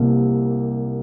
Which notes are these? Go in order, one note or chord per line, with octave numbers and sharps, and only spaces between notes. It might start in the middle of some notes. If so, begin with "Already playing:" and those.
Already playing: C2 C3 A#3